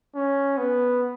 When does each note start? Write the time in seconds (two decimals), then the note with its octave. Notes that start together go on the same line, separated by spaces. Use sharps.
0.15 C#4
0.58 B3